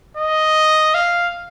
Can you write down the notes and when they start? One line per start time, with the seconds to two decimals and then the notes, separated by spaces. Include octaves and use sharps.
0.17 D#5
0.95 F5